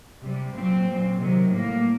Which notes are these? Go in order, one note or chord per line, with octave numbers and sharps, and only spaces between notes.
C3 G3
A#2 F#3 C4
A#2 F#3
C3 D#3 F#3
A2 G3 A#3